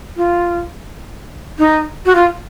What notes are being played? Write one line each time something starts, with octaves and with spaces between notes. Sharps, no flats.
F4
D#4
F#4
F4